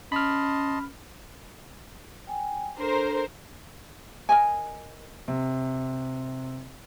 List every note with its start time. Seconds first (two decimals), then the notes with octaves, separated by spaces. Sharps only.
0.12 C#4 D#5 A5 B5 C6 F6
2.27 G5 G#5
2.78 D4 A4 A#4 C5
4.29 A#4 D#5 G#5
5.28 C3